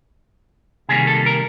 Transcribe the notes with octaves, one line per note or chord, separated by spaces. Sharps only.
C3 D#3 G3 A#3 G#4
A4
A#4